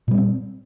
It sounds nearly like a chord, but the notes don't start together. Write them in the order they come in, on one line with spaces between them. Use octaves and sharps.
A#2 G3 B3 C4